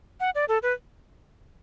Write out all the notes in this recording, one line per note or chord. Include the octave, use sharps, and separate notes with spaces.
F#5
D5
A4
B4